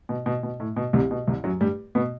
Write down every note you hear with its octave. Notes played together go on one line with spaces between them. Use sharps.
B2
B2
B2
A2
B2
C2 C3
B2
C2 C3
F#2 F#3
G2 G3
B2 B3